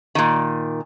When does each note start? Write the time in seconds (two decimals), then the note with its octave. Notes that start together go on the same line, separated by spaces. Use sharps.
0.15 A#2 D#3